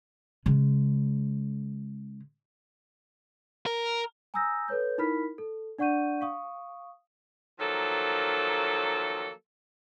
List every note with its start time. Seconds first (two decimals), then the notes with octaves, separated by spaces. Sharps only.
0.46 C#3 G#3
3.66 A#4
4.34 G#5 A#5 D#6 E6 G6 A#6
4.68 A4 B4 C#5 G6
4.98 D#4 E4 A#4 B5 F6 B6
5.38 A4
5.79 D4 D5 F#5 C#6 G6 D#7
6.21 F5 C#6 D#6
7.59 D#3 F3 F#3 A#3 A4